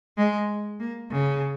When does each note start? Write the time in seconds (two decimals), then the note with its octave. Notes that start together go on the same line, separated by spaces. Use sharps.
0.17 G#3
0.80 A#3
1.11 C#3